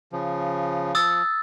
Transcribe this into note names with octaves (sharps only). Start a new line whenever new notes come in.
C#3 F3
F3 D#6 E6 A6